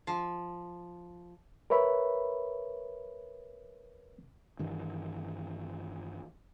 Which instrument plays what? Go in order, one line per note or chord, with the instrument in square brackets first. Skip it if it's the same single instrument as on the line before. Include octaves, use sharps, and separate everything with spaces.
[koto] F3
[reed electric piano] A#4 B4 C#5 E5 B5
[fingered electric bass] G2 D#3 E3